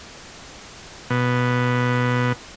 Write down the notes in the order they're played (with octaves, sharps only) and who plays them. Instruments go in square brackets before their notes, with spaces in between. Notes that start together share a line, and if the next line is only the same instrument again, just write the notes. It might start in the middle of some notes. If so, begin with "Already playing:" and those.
[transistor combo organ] B2